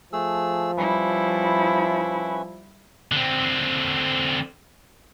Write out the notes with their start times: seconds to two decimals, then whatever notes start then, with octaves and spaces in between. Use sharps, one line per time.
0.13 F3 A3 G#4 E6
0.77 G3 C#4 E4 B4 E5
3.12 D3 C4